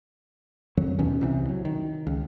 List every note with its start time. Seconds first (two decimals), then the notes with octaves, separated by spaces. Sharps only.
0.77 F2 D#3 F#3
0.99 A1 D#2 B2 C#4
1.21 C2 C3 E3
1.49 F#3
1.65 D#3
2.07 C#2